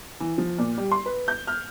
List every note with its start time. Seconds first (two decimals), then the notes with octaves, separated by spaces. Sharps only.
0.20 E3
0.38 F3
0.58 A#2
0.78 G3
0.92 C6
1.06 B4
1.28 G6
1.47 F6